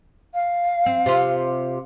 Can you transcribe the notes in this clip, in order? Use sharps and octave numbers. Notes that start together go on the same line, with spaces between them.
F5
C4
C3 F4